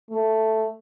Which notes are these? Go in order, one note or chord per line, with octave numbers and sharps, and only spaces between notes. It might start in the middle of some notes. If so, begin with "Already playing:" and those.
A3